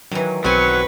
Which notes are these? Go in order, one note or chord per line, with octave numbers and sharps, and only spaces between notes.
D#3 E3 F#3
B1 F#3 C4 B4 G#5 C#6